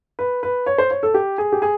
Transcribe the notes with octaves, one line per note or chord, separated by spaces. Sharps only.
B4
B4
C#5
C5
C#5
A4
G4
G#4
G4
G#4